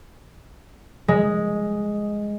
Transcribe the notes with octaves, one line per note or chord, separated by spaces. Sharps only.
G#3